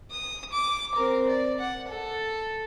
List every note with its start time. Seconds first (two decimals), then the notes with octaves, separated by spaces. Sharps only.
0.11 D#6
0.52 D6
0.95 C4 A#4
1.28 D5
1.60 F#5
1.89 A4